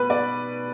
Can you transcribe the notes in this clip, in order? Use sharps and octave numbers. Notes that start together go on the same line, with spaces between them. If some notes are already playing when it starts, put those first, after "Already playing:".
Already playing: B2 B4
D5